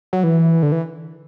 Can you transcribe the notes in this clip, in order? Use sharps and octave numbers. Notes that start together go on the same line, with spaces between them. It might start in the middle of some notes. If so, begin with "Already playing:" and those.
F#3
E3
D3
E3